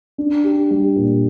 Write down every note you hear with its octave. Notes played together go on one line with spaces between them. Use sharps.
D4
G4
G3
A#2